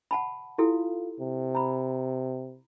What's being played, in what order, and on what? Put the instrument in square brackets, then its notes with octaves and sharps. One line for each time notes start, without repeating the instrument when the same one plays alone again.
[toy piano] F#5 A5 B5
[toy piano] E4 G4 A4 [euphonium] F4
[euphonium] C3
[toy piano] A#5 B5